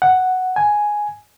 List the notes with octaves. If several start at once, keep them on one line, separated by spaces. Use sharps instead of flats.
F#5
G#5